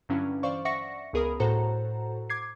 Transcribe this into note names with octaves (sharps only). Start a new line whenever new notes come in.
G2 D3 F#3 C#4 D4 E4
E3 C5 D5 F5 C#6
D5 E5 F#5 C#6 A#6 C#7
C#2 B3 G#4 A#4 B5 D#6
A2 F#4 A4 C5 F#5 A#5
D6 G#6 C7